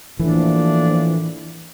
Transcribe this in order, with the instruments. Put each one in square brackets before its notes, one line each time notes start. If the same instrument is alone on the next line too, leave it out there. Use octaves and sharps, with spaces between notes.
[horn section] A2 F3 A#3 D4 [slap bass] E3